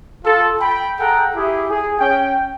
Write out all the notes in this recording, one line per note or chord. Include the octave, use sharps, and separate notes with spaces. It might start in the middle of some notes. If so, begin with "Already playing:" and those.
F4 A4
G5 B5
G#4 A4 F#5 G5 A#5
E4 G4 G#4
G#4
C#4 G5